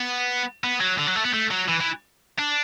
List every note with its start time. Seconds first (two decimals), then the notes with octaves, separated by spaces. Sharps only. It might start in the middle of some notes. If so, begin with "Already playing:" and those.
Already playing: B3
0.64 B3
0.81 F#3
0.99 D3
1.08 F#3
1.16 A3
1.25 B3
1.34 A3
1.51 F#3
1.69 E3
1.81 E3
2.39 D4